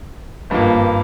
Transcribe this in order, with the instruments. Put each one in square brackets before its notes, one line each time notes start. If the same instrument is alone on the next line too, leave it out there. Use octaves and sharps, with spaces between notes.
[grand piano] G#1 G2 F3 A#3